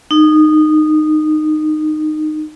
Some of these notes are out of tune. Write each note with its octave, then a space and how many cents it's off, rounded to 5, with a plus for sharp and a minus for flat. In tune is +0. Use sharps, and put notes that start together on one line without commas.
D#4 -20